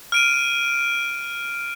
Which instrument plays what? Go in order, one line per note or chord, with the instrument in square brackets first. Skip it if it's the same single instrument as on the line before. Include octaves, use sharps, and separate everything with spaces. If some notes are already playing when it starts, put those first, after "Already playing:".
[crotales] F6 D7 D#7